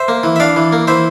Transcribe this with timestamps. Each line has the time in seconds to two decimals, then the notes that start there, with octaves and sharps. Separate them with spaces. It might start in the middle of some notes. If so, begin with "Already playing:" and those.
Already playing: C5 E5
0.08 A#3
0.24 E3
0.36 E5
0.40 D4 D5 F5
0.56 E3
0.73 A#3
0.87 E3 C5 E5